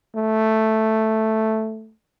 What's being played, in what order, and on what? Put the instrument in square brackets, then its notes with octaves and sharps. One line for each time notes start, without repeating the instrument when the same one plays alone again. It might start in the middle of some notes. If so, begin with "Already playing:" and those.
[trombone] A3